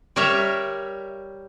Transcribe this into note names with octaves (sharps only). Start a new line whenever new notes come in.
G3 A#4 C#5 E5